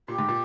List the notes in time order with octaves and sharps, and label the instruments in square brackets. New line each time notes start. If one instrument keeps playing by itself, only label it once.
[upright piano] A#2 [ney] G4
[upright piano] G#2
A#2